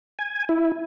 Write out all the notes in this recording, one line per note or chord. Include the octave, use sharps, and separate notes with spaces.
G#5
E4